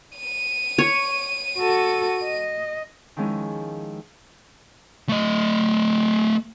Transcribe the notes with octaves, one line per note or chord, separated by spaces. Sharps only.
D#7
C#5
F#4 A4
D#5
D#3 F3 G#3 C#4 E4
A3 D#5